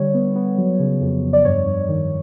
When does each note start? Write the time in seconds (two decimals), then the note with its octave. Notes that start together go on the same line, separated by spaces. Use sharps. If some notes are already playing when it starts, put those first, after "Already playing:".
Already playing: D3 G3 C#5
0.14 B3
0.36 B3
0.58 F#3
0.79 C#3
1.01 F2
1.23 F2
1.33 D5
1.45 G2 C#5
1.66 G2
1.88 D#3